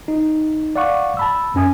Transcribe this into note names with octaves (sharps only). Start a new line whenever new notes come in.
D#4
D5 F5 F#5 C#6 D6
A5 B5 E6
F#2 C#4 G#5 D#6